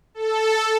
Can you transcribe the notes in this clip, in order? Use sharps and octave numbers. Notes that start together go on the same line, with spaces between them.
A4